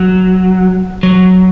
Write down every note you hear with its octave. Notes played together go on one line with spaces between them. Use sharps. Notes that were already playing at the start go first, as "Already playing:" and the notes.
Already playing: F#3
F#3